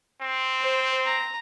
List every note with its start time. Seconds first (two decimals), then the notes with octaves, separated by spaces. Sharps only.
0.21 C4
0.60 C5
1.06 A#5